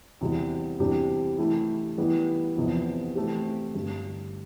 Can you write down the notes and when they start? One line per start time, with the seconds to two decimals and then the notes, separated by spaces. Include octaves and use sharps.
0.21 E2 C3 G3
0.79 E2 C3 G3 D4 G4
1.38 E3 A3 E4 G4
1.98 E3 G3 B3 E4 G4
2.56 E2 C3 F3 B3
3.15 E3 A3 C4 E4 G4
3.75 G2 D3 G3